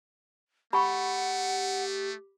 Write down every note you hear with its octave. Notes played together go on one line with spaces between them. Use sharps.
A3 G4 F#5 B5 C#6